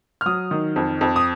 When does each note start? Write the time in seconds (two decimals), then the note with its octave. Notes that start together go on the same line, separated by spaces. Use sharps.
0.21 F6
0.26 F#3 D#6
0.51 D#3
0.76 F2
1.01 F2
1.16 D#6